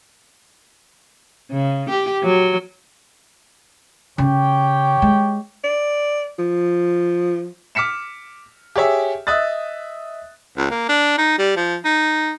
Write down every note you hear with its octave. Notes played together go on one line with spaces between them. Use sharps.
C#3
G4
F#3
C#3 G4 C#5 G5
G#3
D5
F3
D6 F6 B6 C#7 E7
G4 G#4 C#5 E5
D#5 E5 D#6 F#6 A6
C#2
A#3
D4
D#4
G3
F3
D#4